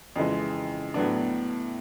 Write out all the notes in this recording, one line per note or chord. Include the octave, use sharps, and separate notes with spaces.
F2 C#3 E3 G#3
A2 F#3 B3 D4